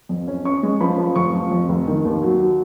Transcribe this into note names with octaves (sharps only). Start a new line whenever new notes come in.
F2
C#4
C#4 C#6
G#3
F3 B5
F3
F1 C#6
F3
F2
F1
D#3
D#2
F#3
F#3